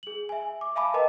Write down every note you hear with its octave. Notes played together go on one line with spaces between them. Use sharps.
G#4 F#7
E5 G#5
D6
E5 F5 G#5 A5 B5 D6
A#4 B4 D#5 G5 A5 A#5